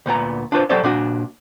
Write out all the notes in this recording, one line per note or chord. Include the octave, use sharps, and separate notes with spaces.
D2 A#2 B3 A#5
D4 F4 B4 C5
F#3 G4 A4 C5 D5 E5
A#2 D4 F#4